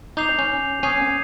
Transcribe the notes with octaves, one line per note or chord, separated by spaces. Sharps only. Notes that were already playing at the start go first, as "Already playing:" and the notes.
D#4 D6 G6 C7 F7
C#4
C#4 D#6 G#6 C7 D#7